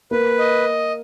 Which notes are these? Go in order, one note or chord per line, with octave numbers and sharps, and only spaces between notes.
A#3 B4
D#5